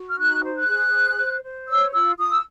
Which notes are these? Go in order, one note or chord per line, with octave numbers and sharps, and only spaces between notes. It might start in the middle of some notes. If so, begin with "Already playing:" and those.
Already playing: F#4
F6
D#4 F#6
C5
F#6
G#4
C5
C5
C5
C#5 E6
F4 E6
F4 D#6
E6